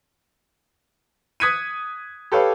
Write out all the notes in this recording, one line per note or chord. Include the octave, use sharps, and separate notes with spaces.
D#6 F#6 G#6 B6 C#7 D#7
G4 A4 B4 C#5 F5